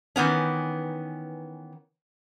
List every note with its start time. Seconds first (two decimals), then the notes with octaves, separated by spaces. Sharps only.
0.16 D#3 E3 B3 C#4